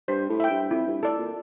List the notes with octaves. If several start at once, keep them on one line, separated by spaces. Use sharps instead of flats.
G2 C5
A2
E5 G5
G2
F2 E4
G2
A2 A4 D5
A#2